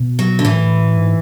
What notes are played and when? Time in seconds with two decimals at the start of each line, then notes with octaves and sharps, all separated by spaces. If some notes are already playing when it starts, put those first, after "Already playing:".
Already playing: B2
0.19 F#3
0.39 D3
0.44 A2 E3
0.96 G#2